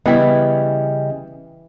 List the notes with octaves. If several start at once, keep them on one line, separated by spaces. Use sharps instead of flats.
C#3 E3 G3 B3 E4 D#5 G5